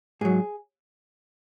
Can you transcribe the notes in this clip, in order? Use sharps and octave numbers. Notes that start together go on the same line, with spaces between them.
G#2 F#3 G#4